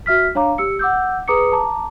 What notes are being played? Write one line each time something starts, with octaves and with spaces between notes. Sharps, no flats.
F#4 E5 F6 B6
D4 C#5 F5 A#5 D6
G4 E6 C#7
F#5 D6 E6 G6
G#4 B4 A#5 D6 D#6 C#7
A5 A#5 D6